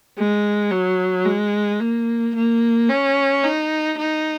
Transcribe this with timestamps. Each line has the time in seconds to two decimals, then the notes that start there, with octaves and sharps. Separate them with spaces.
0.18 G#3
0.71 F#3
1.25 G#3
1.80 A#3
2.35 A#3
2.89 C#4
3.44 D#4
3.98 D#4